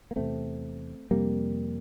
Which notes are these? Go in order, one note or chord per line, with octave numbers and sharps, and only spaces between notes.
A#3
E2 C3 A3 C4
F2 C3 G3 A#3